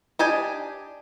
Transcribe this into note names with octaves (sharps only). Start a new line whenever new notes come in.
D4 G4 D5 D#5 G#5